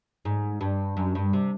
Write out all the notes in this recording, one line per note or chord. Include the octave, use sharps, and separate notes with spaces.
G#2
G2
F#2
G2
C3